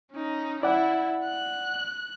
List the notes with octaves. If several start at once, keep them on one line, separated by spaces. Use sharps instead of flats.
C#4 D#4
E4 D5 F#5
F#6